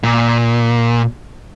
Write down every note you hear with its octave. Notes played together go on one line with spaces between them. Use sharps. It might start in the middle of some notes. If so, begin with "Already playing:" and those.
A#2